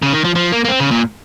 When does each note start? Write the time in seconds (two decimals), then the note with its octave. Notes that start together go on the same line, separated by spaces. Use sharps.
0.02 C#3
0.13 D#3
0.24 F3
0.35 F3
0.52 A#3
0.65 A#3
0.69 C4
0.80 C#3
0.91 A#2